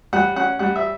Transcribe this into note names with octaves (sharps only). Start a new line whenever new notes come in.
G3 F#5
C#4 F#5
G3 F#5
E5